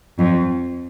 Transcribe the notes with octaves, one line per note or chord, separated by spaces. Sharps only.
F2